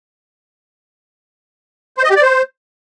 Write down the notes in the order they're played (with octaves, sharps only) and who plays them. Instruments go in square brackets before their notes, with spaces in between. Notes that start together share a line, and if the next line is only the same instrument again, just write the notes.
[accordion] C5
D#5
G4
D5
C5